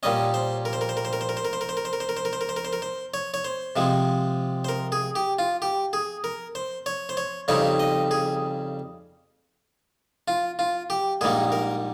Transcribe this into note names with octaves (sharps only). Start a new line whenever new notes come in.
A#2 G3 C#4 D#5
C5
A#4
C5
A#4
C5
A#4
C5
A#4
C5
A#4
C5
A#4
C5
A#4
C5
A#4
C5
A#4
C5
A#4
C5
A#4
C5
A#4
C5
A#4
C5
A#4
C5
C#5
C#5
C5
C3 F3 G#3
C5
A#4
G#4
G4
F4
G4
G#4
A#4
C5
C#5
C5
C#5
F2 C#3 G3 C4 D#4 C#5
D#5
G#4
F4
F4
G4
A#1 G#2 G3 A#3 G#4
A#4